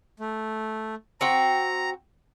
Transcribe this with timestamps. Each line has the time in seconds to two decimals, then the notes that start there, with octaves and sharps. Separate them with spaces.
0.20 A3
1.21 C4 F#4 G5 A#5